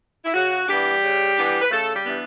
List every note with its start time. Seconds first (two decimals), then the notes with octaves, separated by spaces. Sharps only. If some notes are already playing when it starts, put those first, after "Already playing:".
0.25 E4
0.33 C#3 F#4
0.67 E3 G3 B3 D4 G4
1.02 C#3
1.36 E3 B3 D4
1.61 B4
1.71 C#3 A3 A4
1.94 G3 G4
2.05 E3 B3 D4